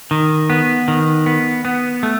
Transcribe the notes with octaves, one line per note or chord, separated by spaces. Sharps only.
D#3
B3
D#3
B3
B3
A3